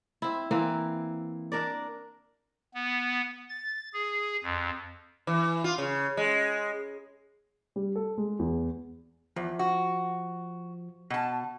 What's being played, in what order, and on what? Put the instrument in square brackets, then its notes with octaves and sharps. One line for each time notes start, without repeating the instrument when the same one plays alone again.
[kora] C4 E4
E3 A#3 C4
D4 A#4 D5
[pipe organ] B3
A6
G#4
F2
[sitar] E3
F4
C#3
G#3
[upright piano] G3
A4
G#3
E2
[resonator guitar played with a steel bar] E2 [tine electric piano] F3
[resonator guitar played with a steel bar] F#4
B2 A5